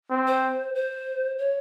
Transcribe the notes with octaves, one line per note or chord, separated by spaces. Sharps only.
C4
C5
C5
C#5